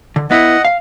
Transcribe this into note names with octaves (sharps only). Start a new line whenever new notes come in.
D3
B3 E4 D#5 F#5
F5